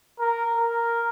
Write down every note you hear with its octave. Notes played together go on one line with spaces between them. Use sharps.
A#4
A#4